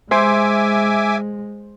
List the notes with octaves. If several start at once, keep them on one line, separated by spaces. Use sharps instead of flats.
G#3 C5 E5 G#5 D6